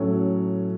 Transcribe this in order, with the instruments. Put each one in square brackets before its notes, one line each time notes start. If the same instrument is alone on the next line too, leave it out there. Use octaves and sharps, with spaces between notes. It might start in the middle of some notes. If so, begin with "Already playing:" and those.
Already playing: [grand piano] A2 F#3 A3 C#4